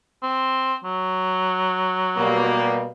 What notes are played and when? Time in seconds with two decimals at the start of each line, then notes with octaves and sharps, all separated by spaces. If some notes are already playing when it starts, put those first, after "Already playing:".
0.23 C4
0.84 F#3
2.17 B2 G3 A#3